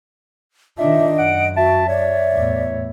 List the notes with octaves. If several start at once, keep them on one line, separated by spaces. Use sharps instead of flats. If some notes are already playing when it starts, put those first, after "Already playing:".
D#3 D4 F4 D#5 E5
F#2 F#5 D7
F#4 E5 A5
C#5 D5
E2 A2